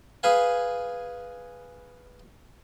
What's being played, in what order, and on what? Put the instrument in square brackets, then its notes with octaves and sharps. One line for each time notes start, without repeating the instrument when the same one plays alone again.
[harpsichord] G#4 B4 F5 G#5